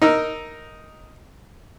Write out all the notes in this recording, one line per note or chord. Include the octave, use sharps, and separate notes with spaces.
D#4 A#4 E6